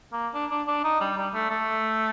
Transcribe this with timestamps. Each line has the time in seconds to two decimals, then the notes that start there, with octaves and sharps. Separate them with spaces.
0.13 A#3
0.34 D4
0.51 D4
0.68 D4
0.84 D#4
1.01 G3
1.17 G3
1.34 A3
1.50 A3